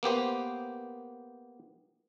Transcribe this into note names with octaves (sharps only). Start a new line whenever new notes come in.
A#3 B3 G4 C5